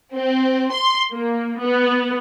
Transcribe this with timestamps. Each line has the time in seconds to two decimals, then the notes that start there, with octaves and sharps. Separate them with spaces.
0.15 C4
0.72 C6
1.13 A#3
1.59 B3